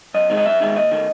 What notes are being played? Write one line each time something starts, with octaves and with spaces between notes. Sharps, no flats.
F#2 D#5
D#3 G#3 D#4
D#5
F#2 E5
D#3 G#3 D#4
D#2 D#5
D#3 A3